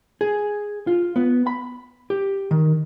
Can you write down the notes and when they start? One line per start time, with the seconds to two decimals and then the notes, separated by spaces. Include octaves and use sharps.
0.21 G#4
0.87 F4
1.16 B3
1.47 B5
2.10 G4
2.51 D#3